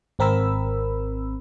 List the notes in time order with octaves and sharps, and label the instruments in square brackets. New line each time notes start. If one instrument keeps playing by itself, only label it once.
[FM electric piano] G#1 C4 A#4 B5 E6